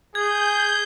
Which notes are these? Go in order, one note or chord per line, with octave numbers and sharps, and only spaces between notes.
G#4 G6 G#6